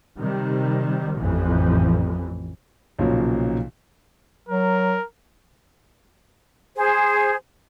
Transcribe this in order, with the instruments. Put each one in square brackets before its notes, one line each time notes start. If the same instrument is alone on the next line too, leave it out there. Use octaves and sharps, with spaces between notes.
[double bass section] C3 D#3 G3
A1 F2 E3
[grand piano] B1 A#2 C#3 F3 F#3 A#3
[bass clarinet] F#3 [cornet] A#4
[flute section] G#4 C5